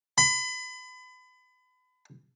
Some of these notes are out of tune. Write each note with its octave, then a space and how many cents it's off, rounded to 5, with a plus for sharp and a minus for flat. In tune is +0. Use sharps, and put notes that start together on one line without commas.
B5 +35